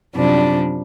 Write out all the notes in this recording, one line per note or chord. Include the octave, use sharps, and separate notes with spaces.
F#2 C3 F3 G3 D4